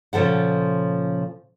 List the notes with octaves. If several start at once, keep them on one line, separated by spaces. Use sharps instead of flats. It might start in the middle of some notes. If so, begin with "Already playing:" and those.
A#2 C#3 F3 A4 F#5